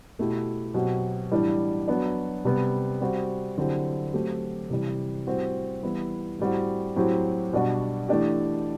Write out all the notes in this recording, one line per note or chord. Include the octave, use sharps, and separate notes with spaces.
B2 A3 E4 G4
B2 F#3 C4 G4
A2 E3 G3 D4
F#3 B3 D4
C3 G3 B3
G3 C4 F#4
D3 F#3 C4 E4 G4
F#3 A3 C4 G4
C3 E3 G3
A2 G3 C4 F#4
E3 G3 B3 E4
A2 G3 C4 F#4
A2 F#3 C4 G4
B2 G3 D4 F#4
E3 A3 D4 G4